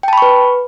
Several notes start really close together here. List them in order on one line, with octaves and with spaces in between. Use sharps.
G5 A5 B5 C#6 B4